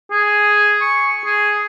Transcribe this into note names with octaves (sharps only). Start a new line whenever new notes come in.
G#4
C#6
G#4